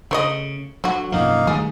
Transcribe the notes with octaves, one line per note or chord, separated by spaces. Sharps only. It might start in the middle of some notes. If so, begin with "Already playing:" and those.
C#3 A3 C#5 D#5
D3 F#3 F#4
B1 F#2 F3 A#3 D#4 F5
D#3 G3 A3 G#4